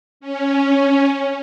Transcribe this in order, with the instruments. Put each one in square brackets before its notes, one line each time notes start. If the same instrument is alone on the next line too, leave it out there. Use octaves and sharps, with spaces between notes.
[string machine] C#4